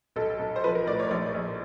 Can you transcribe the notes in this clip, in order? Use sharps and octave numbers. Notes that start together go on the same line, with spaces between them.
B1 A4
B1
C5
F3 B4
A#4
A2 D5
C#5
A#1 D5
A#1